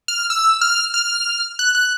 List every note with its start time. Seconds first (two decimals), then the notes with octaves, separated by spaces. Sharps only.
0.08 F6
0.30 E6
0.61 F6
0.94 F6
1.59 F#6
1.75 F#6